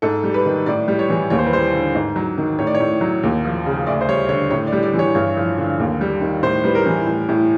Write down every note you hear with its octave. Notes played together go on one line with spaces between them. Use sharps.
G#2 A4
G3
B4
D#3
A2 D5
G3
C#5
E3
D#2 C#5
C5
B4
G3 C5
D3
G#2
F#3
D#3
A2 C#5
D5
C#5
A2
F#3
D#2
F3
C#3
D2 D5
C5
G3 C#5
D3 C#5
A2 C#5
D5
G3
D5
E3
C#5
G2 C#5
F3
D3
D#2
G3
D#3
A2 C5
G3 B4
A#4
E3
A2
A2